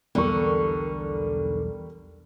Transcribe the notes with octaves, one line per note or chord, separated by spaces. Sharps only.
B1 E2 D3 G3 A#4 C#6